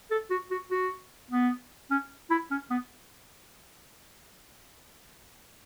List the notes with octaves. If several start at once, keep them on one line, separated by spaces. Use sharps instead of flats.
A4
F#4
F#4
F#4
B3
C#4
E4
C#4
B3